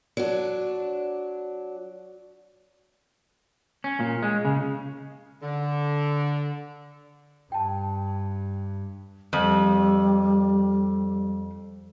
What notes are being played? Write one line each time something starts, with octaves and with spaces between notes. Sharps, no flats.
F#3 D4
C#4
A#2
G#3
C#3
D3
G2 G5 A5
F2 G3